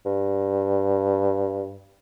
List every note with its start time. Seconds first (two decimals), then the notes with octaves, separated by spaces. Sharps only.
0.05 G2